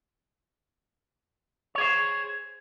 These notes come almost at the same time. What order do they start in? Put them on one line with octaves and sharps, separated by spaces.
C#5 G#4 C5